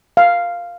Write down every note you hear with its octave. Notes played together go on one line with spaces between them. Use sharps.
F5